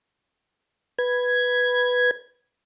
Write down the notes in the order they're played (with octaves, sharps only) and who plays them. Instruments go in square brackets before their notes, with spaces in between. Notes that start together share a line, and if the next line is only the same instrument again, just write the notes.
[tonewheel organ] B4 G#6